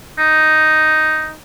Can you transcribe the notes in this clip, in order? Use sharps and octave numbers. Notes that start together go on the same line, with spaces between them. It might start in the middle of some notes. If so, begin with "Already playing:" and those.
D#4